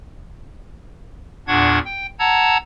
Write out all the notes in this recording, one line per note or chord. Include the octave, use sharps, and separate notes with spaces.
E2 A#2 D4 F#5 C#6 G#6
G5
F#5 A5 A#5 E6 G#6